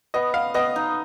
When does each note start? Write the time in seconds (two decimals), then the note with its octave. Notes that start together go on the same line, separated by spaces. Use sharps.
0.14 B3 D#5
0.34 B3 F5
0.54 B3 D#5
0.76 D#4